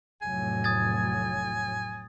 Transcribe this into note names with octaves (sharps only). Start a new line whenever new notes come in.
F1 A2 F#3 G#5
D#6 G#6 A6